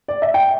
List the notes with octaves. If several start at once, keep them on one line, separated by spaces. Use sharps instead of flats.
D5
E5
G5